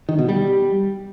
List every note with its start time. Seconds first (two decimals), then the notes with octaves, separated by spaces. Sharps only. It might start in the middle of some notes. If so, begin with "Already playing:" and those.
0.09 D#3
0.19 B2
0.29 G3